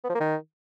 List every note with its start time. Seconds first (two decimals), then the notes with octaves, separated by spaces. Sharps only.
0.04 B3
0.09 F3
0.15 A#3
0.20 D#3